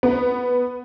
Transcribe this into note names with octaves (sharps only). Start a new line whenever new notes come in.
B3